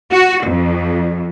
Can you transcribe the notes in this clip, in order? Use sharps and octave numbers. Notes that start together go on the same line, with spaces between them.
F#4
F2